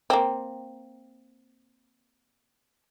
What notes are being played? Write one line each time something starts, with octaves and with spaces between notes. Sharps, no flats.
A#3 C4